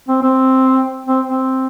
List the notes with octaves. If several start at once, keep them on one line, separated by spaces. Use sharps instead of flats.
C4
C4
C4
C4